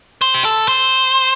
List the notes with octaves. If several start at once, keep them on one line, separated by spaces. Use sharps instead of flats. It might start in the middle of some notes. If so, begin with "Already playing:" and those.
C5
G4
A4
C5